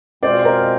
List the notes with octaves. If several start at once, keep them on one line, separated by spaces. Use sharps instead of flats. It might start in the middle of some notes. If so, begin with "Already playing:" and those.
B2 G#3 C4 F4 C5 D5
A#4 C5